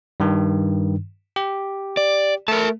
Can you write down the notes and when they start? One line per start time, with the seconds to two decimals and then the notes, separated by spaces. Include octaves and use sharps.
0.20 G2 D#3
1.36 G4
1.97 D5
2.48 A3 A#4 A5